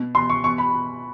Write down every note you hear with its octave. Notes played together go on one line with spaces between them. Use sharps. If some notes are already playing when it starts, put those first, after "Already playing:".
Already playing: B2
B2 C6
C#6
B2 C#6
B5
B2